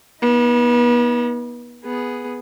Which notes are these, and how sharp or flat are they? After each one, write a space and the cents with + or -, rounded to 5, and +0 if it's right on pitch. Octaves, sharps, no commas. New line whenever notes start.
B3 -35 D#4 +35
B3 +0 G#4 +0